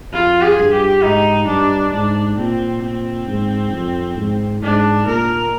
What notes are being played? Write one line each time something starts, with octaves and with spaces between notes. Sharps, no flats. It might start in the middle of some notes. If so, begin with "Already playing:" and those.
F2 F4
G#4
G2
G4
G#2 D#4
G2 D4
G#2 D4
A#2 C4
A#2 C4
G#2
F2
G#2
G#2 D4
A#2 A#4